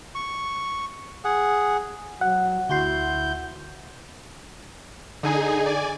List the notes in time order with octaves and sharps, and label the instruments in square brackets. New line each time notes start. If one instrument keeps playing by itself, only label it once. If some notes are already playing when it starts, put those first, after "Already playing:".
[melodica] C#6
G#4 F#5
[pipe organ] F#3 [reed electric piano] F#5
[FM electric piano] D2 F#4 C6 [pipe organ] E4 G6
[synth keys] D3 [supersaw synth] D#4 G#4 G#5
[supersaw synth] D5 G#5